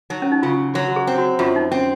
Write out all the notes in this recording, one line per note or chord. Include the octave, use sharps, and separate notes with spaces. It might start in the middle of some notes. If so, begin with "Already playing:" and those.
F#3 D#4
C#4
D#4
C#3 F4
F#3 F#4
F#4
G#4
C4
F#4
F#2 F4
D#4
C4 C#4